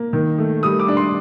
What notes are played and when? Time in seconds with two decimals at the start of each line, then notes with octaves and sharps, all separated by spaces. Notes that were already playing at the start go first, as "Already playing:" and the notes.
Already playing: A#3
0.13 D#3
0.38 A3
0.63 G3 D#6
0.80 D6
0.88 D4
0.97 C6